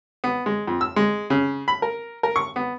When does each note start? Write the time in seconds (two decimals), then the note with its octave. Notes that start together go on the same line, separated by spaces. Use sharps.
0.24 B3
0.46 G#3
0.67 F2
0.81 E6
0.96 G#3
1.30 C#3
1.68 B5
1.82 A#4
2.23 A#4
2.36 C#6
2.56 B3